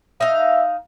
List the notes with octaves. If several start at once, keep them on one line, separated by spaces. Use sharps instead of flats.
D#4 E5 F5